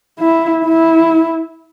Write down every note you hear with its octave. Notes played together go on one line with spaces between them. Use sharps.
E4
E4